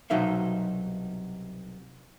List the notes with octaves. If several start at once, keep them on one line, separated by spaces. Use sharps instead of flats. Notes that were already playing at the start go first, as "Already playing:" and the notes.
C2 B2 F#3 D#4 E5 F5